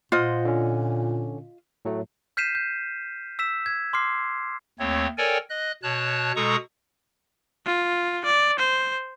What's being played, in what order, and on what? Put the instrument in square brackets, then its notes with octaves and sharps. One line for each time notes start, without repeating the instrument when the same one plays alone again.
[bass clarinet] A#2 [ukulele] F4 D#5 [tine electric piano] C5 F#5
[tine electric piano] D3 C#4
A2 F#3 A3
[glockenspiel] F6 G6 B6 C7 D#7 E7
G6
E6 B6 E7
G#6
C6 D6 F6 C7
[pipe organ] D#2 A3 C4 C#5
A4 A#4 C#5 D5 G5 G#5
D#5 F#6
B2 C#5 A5 F#6
B2 G#3 A4 A#5 C#6 D#6
[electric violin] F4
D5
C5